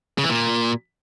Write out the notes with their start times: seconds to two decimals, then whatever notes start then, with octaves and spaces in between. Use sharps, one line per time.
0.18 C#3
0.24 E3
0.29 A#2